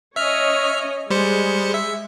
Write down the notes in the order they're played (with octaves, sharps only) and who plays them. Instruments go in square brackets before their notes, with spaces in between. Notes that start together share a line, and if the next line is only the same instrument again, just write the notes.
[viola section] C#4 C#5 D#5 [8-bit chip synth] E5 F6
[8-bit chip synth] G3 C5 C#7 [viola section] G#3
[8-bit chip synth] E5